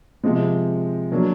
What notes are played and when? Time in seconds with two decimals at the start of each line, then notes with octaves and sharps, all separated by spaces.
0.23 C3 F3 G#3
1.12 D3 F#3 A#3 D4